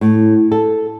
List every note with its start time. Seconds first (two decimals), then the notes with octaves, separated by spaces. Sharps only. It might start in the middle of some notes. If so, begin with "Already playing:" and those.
0.01 A2
0.52 A4